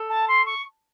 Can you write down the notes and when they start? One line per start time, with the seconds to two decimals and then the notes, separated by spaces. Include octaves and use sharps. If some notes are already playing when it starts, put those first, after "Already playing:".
Already playing: A4
0.09 A5
0.28 C6
0.46 C#6